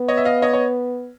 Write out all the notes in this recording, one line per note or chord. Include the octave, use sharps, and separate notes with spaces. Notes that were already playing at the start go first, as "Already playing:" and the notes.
Already playing: B3
C#5 D#5
E5
D#5 F5
C#5 D#5
C#5